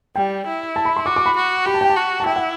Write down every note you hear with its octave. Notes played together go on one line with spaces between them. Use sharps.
G3 G5
E4
A5
B5
C6
F#4 D6
D6
B5
F#4
G4 B5
A5
G5
A5
F#4
A5
E4 G5
F#5